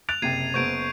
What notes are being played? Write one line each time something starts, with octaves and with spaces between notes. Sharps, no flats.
F#6 A6 D7 F7
F#1 C3 G5 G#6 C7 D#7
F#1 B3 C5 C#6 G6 D7